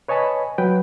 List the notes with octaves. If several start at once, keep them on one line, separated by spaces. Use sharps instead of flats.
B4 C#5 D#5 G#5 A5 B5
F#3 B4 G5